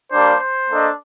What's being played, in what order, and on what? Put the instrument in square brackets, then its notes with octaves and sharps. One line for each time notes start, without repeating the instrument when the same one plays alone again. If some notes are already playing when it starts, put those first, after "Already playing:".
[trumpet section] G3 A#3 D4 [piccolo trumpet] C5
[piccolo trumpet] C5
[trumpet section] A#3 D4 A4 D#5